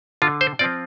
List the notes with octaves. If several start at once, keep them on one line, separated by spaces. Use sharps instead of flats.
D3 F4
C5
F3 C4 F4 D5